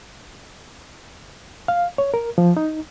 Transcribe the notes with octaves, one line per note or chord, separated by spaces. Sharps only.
F5
C#5
A#4
F3
D#4